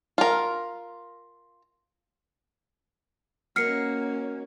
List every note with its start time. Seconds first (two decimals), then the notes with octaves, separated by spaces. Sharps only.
0.18 F4 A#4
3.56 A#3 C#4 F#4 A#4 D#5 F6 C7 C#7